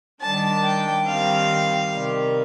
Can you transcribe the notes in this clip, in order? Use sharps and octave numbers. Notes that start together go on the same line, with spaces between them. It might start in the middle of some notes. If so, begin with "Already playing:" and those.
D#3 G3 D4 A5
G5
D#3 G3 C4 F5
C3 D#3 G3